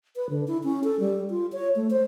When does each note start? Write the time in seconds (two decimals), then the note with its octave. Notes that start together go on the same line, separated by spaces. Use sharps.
0.16 B4
0.30 D3
0.48 E4
0.64 C#4
0.84 A4
1.00 G3
1.30 F4
1.53 C#5
1.76 A3
1.91 C5